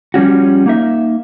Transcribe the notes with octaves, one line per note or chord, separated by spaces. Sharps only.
F3 G3 C#4 F#4
A#3 D#4 E5